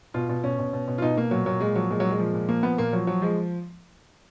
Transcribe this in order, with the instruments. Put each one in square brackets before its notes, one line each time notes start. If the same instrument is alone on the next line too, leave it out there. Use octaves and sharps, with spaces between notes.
[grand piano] B2 F4
B2
B2 C#4
B2
B2
B2
F4
B2 D#4
B2 A#3
A#2 F#3
A#2 F#3
A#2 G#3
F3 F#3
A#2 G#3
F#3
A#2
G#3
F3
A#2
F3 A#3
F3 B3
A#2 A#3
F3 F#3
F3 F#3
F3 G#3